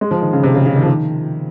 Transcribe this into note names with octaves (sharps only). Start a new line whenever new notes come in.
G#3
F3
D#3
C#3
C3
C#3
C#3
D#3
F3
D#3